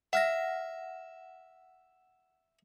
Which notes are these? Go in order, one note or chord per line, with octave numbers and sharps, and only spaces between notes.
E5 F#5 F6 A#6